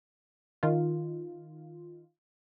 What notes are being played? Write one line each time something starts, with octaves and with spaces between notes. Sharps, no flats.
D#3 F4